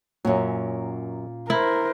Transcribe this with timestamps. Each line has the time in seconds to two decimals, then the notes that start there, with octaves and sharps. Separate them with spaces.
0.25 F#2 A#2 F#3 C#4
1.50 E4 A#4 C5